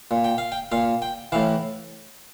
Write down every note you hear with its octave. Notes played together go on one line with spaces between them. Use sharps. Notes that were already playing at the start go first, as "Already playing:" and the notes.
A#2
G5
F5
G5
A#2 F5
G5
A2 E3 F5